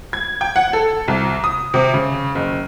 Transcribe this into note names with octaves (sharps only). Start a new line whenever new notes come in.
G#6
G5
F#5
A4
C2
D#6
C3
C#3
F#1